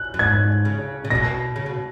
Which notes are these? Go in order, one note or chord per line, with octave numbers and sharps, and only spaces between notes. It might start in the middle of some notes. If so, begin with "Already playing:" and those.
Already playing: F#6
F#2
G#2 G#6
C#3
C#3
B2 A#6
C#3
B2